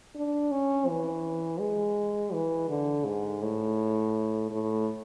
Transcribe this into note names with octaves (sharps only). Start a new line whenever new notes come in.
D4
C#4
E3
G#3
E3
D3
G#2
A2
A2